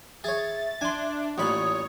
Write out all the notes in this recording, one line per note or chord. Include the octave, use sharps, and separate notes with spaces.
G#4 C#5 E5 A6
D4 G#5 C6
A1 A#2 C#5 B5 D#6